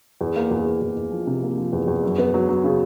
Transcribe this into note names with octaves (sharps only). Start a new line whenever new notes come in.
E2
A#3
E2
E2
E2
E2
F3
C3
A#3
F3
E2
E2
F#2
B3
F#3
F#3
C#3